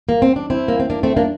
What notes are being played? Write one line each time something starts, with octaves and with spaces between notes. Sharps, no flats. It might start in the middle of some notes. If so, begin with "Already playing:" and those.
A#3
C4
D4
C4 E4
A#3
C4
A#3 D4
A3 C4
A#3 D4